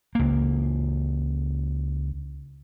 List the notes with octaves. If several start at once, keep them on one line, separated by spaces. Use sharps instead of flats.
C#2 A#3